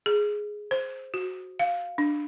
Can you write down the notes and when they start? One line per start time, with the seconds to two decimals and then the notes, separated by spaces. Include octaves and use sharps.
0.06 G#4
0.71 C5
1.14 F#4
1.59 F5
1.98 D4